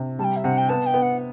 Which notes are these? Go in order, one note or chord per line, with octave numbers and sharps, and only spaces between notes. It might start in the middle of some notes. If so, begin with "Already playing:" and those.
Already playing: C3
G3 A5
G5
E5
C3 F#5
G5
B3 A5
G5
B3
F#5